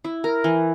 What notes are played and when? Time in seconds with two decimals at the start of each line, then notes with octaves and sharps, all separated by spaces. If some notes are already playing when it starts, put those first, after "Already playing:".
0.05 E4
0.24 A#4
0.44 E3